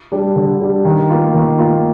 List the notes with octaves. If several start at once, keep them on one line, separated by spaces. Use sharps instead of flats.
G3 D4
D3
G3 D4
D#3
A#3 F4
D#3
A#3 F4